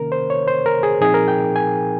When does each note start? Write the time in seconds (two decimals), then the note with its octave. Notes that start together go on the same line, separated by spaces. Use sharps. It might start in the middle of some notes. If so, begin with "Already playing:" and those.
Already playing: C3 D#3 A#3 C#4 A#4
0.12 C5
0.30 C#5
0.48 C5
0.66 A#4
0.83 G#4
1.01 A#2 F3 C4 D#4 G#4
1.14 A#4
1.28 G5
1.56 G#5